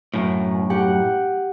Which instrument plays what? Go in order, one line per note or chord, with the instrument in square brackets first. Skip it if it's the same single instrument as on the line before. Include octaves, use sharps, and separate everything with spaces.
[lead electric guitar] F#2 A2
[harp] G4 F#5